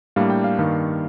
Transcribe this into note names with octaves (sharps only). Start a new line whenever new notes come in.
A2 G3 A#3 D4 F5
G5
F5
G2 D#3 A#3